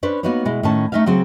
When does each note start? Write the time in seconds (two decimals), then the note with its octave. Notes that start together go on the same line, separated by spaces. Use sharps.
0.03 C#4 D4 B4 C5
0.23 A#3 B3 D#4 F#4 B4 C#5
0.45 B2 G#3 E4
0.63 A2 D#3 C#4 A5
0.92 A3 C#4 D#4 E5 F5
1.06 C#3 F#3 C4 G#4 F#5